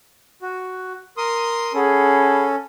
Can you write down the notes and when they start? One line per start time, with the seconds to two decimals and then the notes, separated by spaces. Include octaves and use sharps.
0.42 F#4
1.17 A#4 C6 D#6
1.74 C#4 G#4 A4 F#5 B5